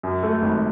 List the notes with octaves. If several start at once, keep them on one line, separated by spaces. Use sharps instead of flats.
F#2
A3
G#1